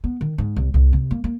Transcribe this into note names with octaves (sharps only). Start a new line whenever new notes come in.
B3
D#3
G#2
C2
C2
C3
A#3
A#3